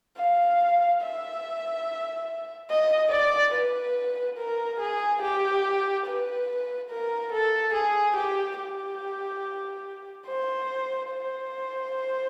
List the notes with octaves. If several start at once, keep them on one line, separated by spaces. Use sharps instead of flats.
F5
E5
D#5
D5
B4
A#4
G#4
G4
B4
A#4
A4
G#4
G4
G4
C5
C5